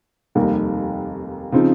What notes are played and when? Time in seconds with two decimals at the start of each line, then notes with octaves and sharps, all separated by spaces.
0.35 F1 D#2 D#3 G3 A#3
1.52 C#3 F3 C4 D#4